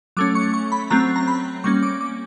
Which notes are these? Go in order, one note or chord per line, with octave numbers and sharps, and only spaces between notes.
F#3 A3 C#4 D6
C#6
C#6
B5
F#3 A3 C4 A#5
A#5
B5
G3 A#3 C#4 C#6
D6
D6